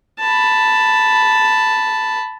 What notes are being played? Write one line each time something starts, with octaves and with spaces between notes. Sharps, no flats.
A5 B5